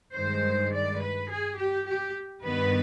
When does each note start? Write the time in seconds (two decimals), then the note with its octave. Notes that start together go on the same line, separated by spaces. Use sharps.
0.14 G2 D#3 G#3 C5
0.72 D5
1.01 B4
1.29 G#4
1.57 G4
1.86 G4
2.44 G2 D#3 B3 B4